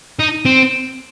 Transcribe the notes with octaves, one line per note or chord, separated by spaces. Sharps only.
D#4
C4